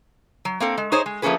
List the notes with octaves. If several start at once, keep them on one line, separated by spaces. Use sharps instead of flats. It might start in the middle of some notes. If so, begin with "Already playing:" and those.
F#3
A#3 C4 A4
G#3
D#4 G#4 C5 C#5 D#5
G#3
F3 A3 A#3 C#4 G#4 B4